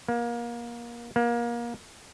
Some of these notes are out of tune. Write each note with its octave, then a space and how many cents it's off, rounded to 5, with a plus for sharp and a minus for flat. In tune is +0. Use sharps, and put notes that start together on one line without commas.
A#3 +25
A#3 +25